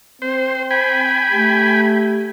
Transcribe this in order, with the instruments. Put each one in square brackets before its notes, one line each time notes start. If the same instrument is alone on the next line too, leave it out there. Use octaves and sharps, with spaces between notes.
[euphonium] C4 [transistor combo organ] C5
[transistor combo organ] G5 G#5 B5
[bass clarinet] A3 [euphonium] G4